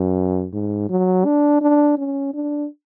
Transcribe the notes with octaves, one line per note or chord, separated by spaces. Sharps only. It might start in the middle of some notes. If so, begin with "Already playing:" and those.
Already playing: F#2
G#2
F#3
D4
D4
C#4
D4